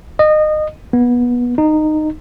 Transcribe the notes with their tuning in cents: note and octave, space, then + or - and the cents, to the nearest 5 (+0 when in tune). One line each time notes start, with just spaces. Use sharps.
D#5 -25
B3 -20
D#4 -15